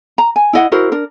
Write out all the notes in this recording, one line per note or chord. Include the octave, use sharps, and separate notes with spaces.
A#5
G#5
E4 D#5 F#5
E4 F#4 A#4 C5
D4 A#4